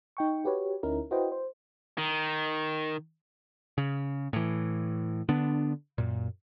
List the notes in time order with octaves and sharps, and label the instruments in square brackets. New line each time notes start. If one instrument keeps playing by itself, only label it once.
[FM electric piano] D#4 G5 C#6
F#4 G4 B4 C#5
D2 C#4 D#4 E4 A#4
E4 F#4 B4 C5 D#5 G5
C5
[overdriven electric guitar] D#3
[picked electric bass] C#3
A2 E3
D3 B3 D4
F#2 A#2